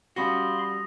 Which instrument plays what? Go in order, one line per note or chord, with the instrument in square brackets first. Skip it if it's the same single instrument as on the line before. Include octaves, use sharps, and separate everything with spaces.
[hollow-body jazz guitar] G3 C#4 F#4 [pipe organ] F5 B5 C6 [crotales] D#6 A#6